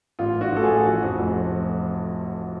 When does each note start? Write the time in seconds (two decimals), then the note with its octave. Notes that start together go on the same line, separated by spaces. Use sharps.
0.19 A1 F4
0.35 A1
0.41 F#4
0.52 A1 A4
0.63 G#4
0.68 A1
0.85 F3 F#4
1.02 F2
1.19 F1